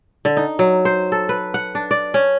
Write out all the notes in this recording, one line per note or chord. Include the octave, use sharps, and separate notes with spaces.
D3
D#4
F#3
C5
A4
B4
F#5
D4
D5
C#4